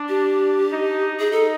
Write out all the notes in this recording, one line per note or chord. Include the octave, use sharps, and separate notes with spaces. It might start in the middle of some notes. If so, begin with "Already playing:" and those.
Already playing: D4
G4
D#4
D#4 G#4
A4